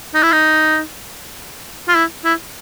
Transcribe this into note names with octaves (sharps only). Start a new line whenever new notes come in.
D#4
E4
D#4
F4
E4
E4